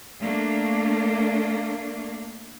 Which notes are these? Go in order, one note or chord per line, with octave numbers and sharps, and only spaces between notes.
A3 A#3 D4